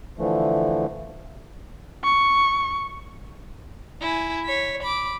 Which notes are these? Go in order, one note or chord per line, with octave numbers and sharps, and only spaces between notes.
D3 E3 F3 A3
C#6
E4 G#5
C#5 B6
B5 D6